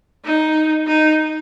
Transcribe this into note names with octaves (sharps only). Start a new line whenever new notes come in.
D#4
D#4